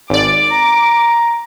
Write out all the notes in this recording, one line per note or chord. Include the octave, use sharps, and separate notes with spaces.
G#1 D5 D6
A#5